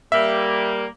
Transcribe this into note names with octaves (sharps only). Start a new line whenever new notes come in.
G3 A#3 E5